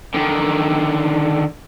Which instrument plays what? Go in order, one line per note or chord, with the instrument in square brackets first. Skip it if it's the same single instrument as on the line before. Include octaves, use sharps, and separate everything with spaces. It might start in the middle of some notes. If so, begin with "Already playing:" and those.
[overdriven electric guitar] D3 D#3